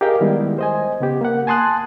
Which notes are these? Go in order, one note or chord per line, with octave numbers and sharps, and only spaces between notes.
G4 G#4 A#4 D#5 F5 G5
D#3 G3 G#3 B3 E4
C5 D#5 G#5
C#3 B3 G4
A#3 F#5
G#5 A5 C6 D#6 F#6